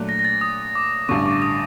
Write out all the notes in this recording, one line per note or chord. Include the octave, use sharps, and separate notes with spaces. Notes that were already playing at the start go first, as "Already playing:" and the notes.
Already playing: A#2 F#3 A3 D4
A#6
A#6
A6
D#6
D6
A1 G2 D3 C#6
D6
D#6